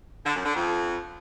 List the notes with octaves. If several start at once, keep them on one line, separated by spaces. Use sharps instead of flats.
D3
F#2
D3
F2